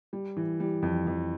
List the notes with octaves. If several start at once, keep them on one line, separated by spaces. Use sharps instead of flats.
G3
E3
G3
F2
F2